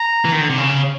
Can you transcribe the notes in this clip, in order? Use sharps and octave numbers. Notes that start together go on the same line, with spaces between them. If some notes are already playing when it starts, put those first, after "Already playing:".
Already playing: A#5
E3
D#3
D3
C3
C#3